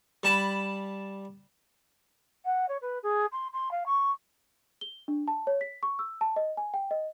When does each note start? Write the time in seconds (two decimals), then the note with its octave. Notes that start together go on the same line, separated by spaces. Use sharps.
0.23 G3 A5 B5
2.45 F#5
2.68 C#5
2.81 B4
3.02 G#4
3.32 C6
3.53 C6
3.71 F5
3.85 C#6
4.81 G7
5.08 D4
5.28 A5
5.47 C#5
5.61 B6
5.83 C#6
5.99 E6
6.21 A5
6.36 D#5
6.57 G#5
6.74 G5
6.91 D#5